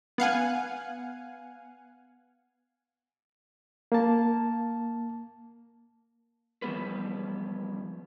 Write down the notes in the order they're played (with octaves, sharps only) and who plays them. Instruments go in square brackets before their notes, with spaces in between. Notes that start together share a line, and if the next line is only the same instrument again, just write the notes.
[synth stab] B3 F5 F#5 G#5
[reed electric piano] A#3 A5
[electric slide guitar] E3 F3 G3 B3 G#4 B4